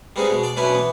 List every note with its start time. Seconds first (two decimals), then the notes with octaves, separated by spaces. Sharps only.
0.16 G3 G#3 B3 C4 D#4 G#4
0.30 B2 G#3
0.43 D5 D6
0.57 B2 F#3 C#4 D4 E4 B4
0.73 E3 B3